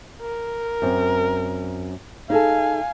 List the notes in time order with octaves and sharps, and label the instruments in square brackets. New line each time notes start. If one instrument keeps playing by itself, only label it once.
[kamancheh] A#4
[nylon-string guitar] F#2 C4
[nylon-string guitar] D#4 G#4 A4 [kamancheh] F5 G#5